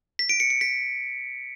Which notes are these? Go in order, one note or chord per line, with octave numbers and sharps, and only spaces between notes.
B6
D7
C#7
C#7
B6